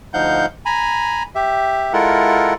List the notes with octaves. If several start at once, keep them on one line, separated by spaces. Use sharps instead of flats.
D2 F3 D#4 F5 F#5 G6
G#5 A#5 B5
G4 E5
G#3 E4 F4 A4 A#4 F#5